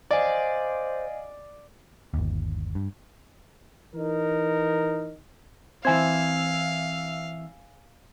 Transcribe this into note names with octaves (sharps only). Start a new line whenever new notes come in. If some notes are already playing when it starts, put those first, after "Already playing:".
C5 D5 D#5 F5 G#5
G1 D#2
G2
E3 D#4 A#4
E3 C4 C5 E5 F5 G#5 E6 G#6